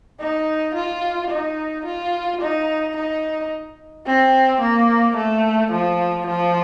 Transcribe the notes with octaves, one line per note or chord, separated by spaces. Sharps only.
D#4
F4
D#4
F4
D#4
D#4
C4
A#3
A3
F3
F3